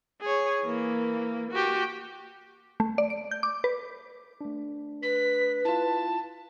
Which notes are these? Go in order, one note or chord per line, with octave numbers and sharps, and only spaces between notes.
G#4 C#5
E3 A#3
F#4 G4
A3
D5
D7
G6
D6
B4
A3 D4
B4 B6
E4 F4 A5